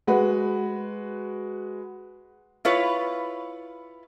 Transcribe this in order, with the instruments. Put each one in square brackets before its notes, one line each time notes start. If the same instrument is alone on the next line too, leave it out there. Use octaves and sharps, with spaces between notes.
[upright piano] G#3 F#4 B4
[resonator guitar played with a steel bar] E4 F4 B4 C#5